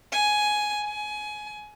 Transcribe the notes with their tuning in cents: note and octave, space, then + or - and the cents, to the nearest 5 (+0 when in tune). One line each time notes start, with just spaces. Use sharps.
G#5 +10
G#5 +20